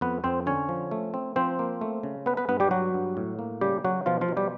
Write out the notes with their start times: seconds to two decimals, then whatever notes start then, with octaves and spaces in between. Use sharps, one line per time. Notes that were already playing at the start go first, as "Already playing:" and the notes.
0.01 F2 B3 B4
0.24 F2 C4 C5
0.46 D3 C#4 C#5
0.69 F3
0.91 A3
1.14 C4
1.36 F3 C4 C5
1.59 A#3
1.81 A3
2.03 C#3
2.26 B3 B4
2.37 B3 B4
2.48 G2 B3 B4
2.60 G3 G4
2.71 F#3 F#4
2.94 G2
3.17 A2
3.39 A#3
3.61 C#3 G3 G4
3.84 C#3 F#3 F#4
4.06 B2 F3 F4
4.21 F3 F4
4.28 B2
4.37 G3 G4